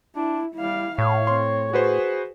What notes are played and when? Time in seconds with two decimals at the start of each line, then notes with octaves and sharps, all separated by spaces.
0.16 D4 E4
0.55 G3 E4 F5
0.98 A2 C#5 F5
1.27 C4 C6
1.73 F#4 G#4 B4 C5